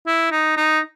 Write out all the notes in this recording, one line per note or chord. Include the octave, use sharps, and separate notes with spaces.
E4
D#4
D#4